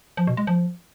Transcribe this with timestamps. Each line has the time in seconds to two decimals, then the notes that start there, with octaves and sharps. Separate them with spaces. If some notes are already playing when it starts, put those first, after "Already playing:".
0.17 F3
0.27 B2
0.37 G#3
0.47 F3